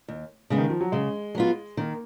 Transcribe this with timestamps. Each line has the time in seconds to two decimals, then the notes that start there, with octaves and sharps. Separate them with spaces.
0.08 D#2
0.50 C#3 G#3 B3
0.58 D#3
0.70 F3
0.81 F#3
0.92 C#3 G#3
1.35 F#3 B3 F4
1.77 D#3 A#3